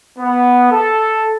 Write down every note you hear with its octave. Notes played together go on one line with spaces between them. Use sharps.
B3
A4